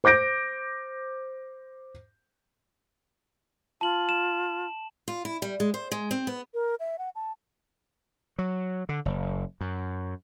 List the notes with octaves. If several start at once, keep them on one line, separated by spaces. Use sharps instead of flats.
C5 D6 G6 A#6 D7
F4 A5 F#7
E7
F4
E4
G3
G#3
C5
G#3
C4
B3
A#4
E5
F#5
A5
F#3
D3
F#1
F#2